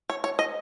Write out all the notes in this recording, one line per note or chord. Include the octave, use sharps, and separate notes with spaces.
C#5
C#5
D#5